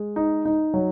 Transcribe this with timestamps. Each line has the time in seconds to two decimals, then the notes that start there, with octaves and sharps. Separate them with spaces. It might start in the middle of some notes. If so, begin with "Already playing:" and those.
Already playing: G#3
0.16 D#4
0.45 D#4
0.74 F#3